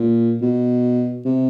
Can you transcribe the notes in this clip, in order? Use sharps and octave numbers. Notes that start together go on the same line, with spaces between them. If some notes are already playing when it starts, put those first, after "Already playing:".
Already playing: A#2
B2
C3